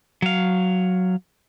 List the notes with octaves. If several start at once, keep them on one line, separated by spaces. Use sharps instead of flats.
F#3 F5